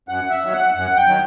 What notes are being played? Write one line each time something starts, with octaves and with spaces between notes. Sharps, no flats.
F#2 F#5
E5
D#3 F#3
F#5
F#2 F#5
G5
D#3 F#3